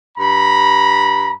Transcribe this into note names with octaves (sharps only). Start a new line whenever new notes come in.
G2 A#5 B5